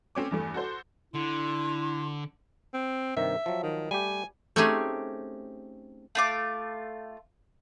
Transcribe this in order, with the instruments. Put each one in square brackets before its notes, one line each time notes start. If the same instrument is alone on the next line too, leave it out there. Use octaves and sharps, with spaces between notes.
[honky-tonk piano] A3 C4 C#4 D6
E2 G2 A3
F#4 A4 C5
[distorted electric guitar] D3 [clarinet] E4 [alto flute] C6
[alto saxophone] C4
[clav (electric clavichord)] G2 C3 D#3 [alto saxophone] E5
[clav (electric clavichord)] F3 F#3
[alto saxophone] D#3
[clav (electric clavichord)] G3 A3 G4 [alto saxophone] G#5
[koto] A3 C4 C#4 D#4 G4 G#4
[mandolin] A3 F4 D6